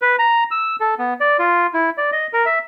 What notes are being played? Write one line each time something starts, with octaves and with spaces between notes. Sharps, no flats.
B4
A#5
E6
A4
B3
D5
F4
E4
D5
D#5
A#4
E5